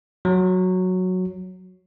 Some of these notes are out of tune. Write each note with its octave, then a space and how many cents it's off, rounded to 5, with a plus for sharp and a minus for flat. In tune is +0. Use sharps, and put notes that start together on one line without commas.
F#3 -5